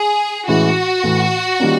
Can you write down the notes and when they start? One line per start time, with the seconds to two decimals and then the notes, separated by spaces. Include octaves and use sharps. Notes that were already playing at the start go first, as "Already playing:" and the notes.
Already playing: G#4
0.48 A2 E3 G#3 C#4 E4 F#4
1.03 A2 E3 A3
1.59 D#3 G3 A#3 C#4 F4